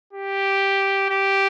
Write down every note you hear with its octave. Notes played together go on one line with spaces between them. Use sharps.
G4
G4